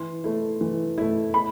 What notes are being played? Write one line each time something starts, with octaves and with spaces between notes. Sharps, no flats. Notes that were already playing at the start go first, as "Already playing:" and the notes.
Already playing: E3 C6
A3 E4
E3
A3 E4
B5